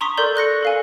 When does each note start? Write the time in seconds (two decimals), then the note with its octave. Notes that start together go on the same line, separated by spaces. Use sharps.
0.01 A#5 C6 C#6 D#6 B6
0.17 A4 A#4 D5 C6 G6
0.36 C#6 F#6 A#6 C#7
0.63 A4 F5 G#5